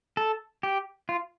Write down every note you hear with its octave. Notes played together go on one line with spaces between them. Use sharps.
A4
G4
F4